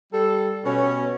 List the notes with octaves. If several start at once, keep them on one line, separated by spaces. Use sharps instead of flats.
G3 A4
B2 C#4